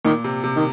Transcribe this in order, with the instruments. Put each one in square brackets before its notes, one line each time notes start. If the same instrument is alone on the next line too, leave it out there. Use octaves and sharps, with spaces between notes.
[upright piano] A#2 [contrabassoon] D#3
[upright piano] C3
C3
[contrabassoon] D#3